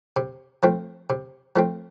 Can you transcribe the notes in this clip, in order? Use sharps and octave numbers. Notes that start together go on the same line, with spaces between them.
C3
F3 A3 C4
C3
F3 A3 C4